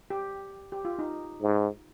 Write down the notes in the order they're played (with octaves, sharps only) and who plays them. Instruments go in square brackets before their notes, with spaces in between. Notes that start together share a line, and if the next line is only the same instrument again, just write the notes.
[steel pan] G4
G4
F4
D#4
[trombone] G#2